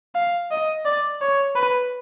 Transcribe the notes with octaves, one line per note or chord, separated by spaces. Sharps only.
F5
D#5
D5
C#5
B4